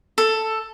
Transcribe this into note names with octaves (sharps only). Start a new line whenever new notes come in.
A4